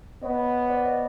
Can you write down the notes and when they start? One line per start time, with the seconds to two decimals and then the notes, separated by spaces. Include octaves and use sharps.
0.23 B3 C#5 D#5
0.70 C5 D5
0.85 C#5 D#5